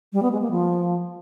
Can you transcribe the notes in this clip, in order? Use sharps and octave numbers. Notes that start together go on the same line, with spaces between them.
G3
B3
G#3
A#3
F3